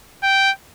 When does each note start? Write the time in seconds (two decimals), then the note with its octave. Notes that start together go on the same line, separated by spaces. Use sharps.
0.23 G5